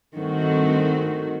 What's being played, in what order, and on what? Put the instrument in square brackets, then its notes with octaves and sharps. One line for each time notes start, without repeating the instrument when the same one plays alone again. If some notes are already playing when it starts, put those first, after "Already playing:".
[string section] G2 D#3 A3 C4 F#4